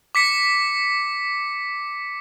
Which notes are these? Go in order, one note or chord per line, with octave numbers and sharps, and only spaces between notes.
D6 B6 C#7